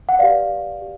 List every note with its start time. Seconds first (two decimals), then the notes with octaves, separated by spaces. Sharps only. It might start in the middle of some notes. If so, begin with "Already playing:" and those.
0.09 F#5
0.19 G4 B4 D5 F5
0.82 G4